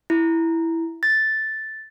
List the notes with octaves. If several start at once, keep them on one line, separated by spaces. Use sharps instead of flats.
E4
A6